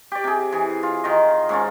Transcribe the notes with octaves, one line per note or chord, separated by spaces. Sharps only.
G4 D5
C3 G#4
E3 G#4
F4
D#3 F4 D#5
G#2 C#4 F4